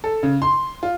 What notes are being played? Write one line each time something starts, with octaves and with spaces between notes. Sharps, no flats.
A4
C#3
C6
F4